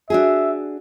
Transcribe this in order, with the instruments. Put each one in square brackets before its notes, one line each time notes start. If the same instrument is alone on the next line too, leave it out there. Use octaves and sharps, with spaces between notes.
[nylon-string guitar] D4 F#4 G#4 [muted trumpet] E5